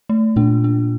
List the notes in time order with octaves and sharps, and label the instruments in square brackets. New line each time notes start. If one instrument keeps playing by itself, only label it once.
[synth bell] A3
[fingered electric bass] A#2 [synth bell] D4
[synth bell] D4